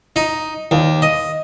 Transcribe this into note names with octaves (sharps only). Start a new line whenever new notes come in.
D#4
D#2
D#5